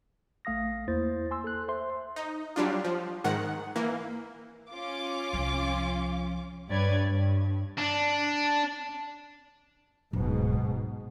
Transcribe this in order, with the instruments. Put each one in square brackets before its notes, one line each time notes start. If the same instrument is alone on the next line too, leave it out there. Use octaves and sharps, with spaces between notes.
[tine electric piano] A#1 A3 F5 D#6 A#6
E2 A#3 E4 C5 A6
G#5 C6 E6
A4 F#6
C5 E5 C6
[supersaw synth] D#4
F#3 G3 D4 F4
F3
G#2 D#3 F#5
E3 A#3
[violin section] C#4 F4 D6
[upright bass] C2 F3
[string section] G2 B4 C#5 D5 G#6
G2
[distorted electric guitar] D4
[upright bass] D1 [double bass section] G#2 B2
[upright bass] B3